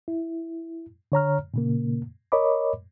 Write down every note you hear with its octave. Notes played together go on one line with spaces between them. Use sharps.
E4
D3 C#5 A#5 F6
A#2 C#3 A#3
A#4 C#5 D#5 B5 D6